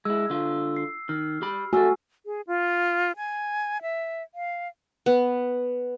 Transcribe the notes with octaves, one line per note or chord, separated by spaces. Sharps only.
G#3 E4 E6
D3 F4
C7
D#3 F6
G4 B5
A3 F#4 G4 A4 G#5 E6
G#4
F4
G#5
E5
F5
B3